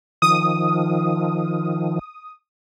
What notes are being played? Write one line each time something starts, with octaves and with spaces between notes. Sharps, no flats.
D#3 F3 D#6